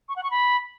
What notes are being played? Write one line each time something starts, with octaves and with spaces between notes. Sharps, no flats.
C#6
F#5
C#6
B5